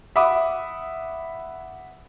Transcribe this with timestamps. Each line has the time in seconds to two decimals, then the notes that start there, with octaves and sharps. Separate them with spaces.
0.16 E5 F#5 B5 D6 D#6